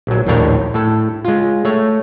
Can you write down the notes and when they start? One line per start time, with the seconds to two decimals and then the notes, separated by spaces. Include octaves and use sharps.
0.07 A#1 F#3
0.27 A#1 D#2 A2 D4 A#4 C#5
0.74 A2 A4
1.25 G#3 F4
1.65 A3 C#5